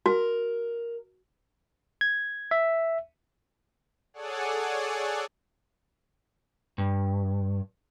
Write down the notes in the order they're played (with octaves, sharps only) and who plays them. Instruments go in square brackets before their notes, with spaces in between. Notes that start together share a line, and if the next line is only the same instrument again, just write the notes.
[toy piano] F#4 [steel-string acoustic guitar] A#4
[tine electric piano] G#6
E5
[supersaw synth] G#4 A4 C#5 D5 F#5 G#5
[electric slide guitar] G2